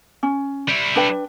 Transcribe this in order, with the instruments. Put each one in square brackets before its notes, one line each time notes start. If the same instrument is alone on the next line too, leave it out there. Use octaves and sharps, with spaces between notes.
[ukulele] C#4
[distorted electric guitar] G3 E4
[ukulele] D4 B4 G5